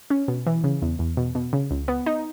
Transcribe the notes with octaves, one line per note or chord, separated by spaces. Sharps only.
C#4
B2
E3
C#3
E2
E2
B2
B2
C#3
C#2
B3
D#4